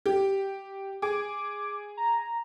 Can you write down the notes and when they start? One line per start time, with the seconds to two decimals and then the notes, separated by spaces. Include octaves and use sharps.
0.06 G4
1.02 G#4 D6
1.97 A#5